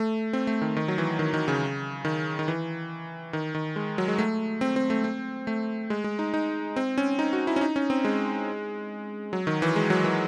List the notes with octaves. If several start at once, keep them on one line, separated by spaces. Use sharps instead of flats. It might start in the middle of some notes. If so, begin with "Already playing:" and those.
Already playing: A3
C4
A3
D#3
D#3
F#3
E3
D#3
D#3
C#3
D#3
D#3
E3
D#3
D#3
G#3
F#3
G#3
A3
C4
C4
A3
C4
A3
G#3
G#3
D#4
D#4
C4
C#4
D#4
F#4
E4
C#4
D#4
C#4
C4
G#3
F#3
D#3
E3
G#3
F#3
E3